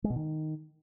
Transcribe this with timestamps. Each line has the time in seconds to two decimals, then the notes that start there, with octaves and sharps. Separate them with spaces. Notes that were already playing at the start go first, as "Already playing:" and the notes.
0.04 G#3
0.10 B2
0.16 D#3